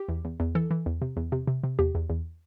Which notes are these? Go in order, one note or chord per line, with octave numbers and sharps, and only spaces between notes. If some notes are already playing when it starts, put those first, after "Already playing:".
Already playing: G4
E2
E2
E2
E3 A4
E3
E2
C3
E2
C3
C3
C3
E2 G4
E2
E2